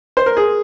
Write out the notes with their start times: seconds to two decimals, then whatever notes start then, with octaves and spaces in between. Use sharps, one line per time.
0.17 C5
0.26 A#4
0.37 G#4